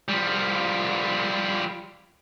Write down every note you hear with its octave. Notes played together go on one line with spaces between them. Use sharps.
F3 G3